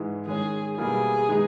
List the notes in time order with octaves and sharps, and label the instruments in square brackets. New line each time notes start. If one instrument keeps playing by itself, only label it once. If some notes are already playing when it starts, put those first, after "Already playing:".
Already playing: [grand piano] G#2 E3 G#3
[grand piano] D#3 G#3 C#4 [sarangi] G#4
[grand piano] B2 G3 A#3 E4 [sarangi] G#4
[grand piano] D#3 G#3 B3 D#4